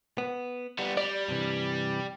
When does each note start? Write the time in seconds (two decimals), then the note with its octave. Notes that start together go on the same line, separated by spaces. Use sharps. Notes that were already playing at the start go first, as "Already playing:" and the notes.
0.18 B3
0.79 G3 B3
0.97 G3 D5
1.28 G2 C3 E3